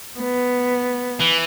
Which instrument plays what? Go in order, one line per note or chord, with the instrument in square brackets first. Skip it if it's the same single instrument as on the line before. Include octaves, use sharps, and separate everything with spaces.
[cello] B3
[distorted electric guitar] E3